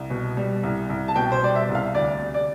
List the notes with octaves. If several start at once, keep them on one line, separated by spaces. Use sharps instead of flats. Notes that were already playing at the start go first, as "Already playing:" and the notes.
Already playing: C2
B2
G3
C2
C2
A5
B2 G5
C5
G3 D5
E5
C2
F5
D2 D5
C3
D5